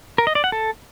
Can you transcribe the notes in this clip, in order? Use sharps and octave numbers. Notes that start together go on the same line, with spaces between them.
A#4
D#5
D5
F#5
A4